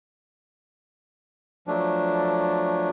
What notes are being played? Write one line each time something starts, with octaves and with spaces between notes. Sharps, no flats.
F3 F#3 A3 D4